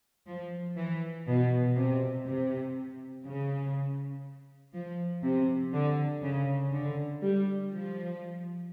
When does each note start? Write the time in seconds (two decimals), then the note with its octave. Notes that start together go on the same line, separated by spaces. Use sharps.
0.27 F3
0.77 E3
1.27 B2
1.76 C3
2.26 C3
3.25 C#3
4.74 F3
5.23 C3
5.73 D3
6.23 C#3
6.73 D3
7.22 G3
7.72 F3